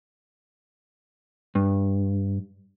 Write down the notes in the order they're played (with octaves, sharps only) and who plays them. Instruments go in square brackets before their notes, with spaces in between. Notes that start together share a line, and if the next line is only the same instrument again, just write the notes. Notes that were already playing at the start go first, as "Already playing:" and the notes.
[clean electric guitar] G2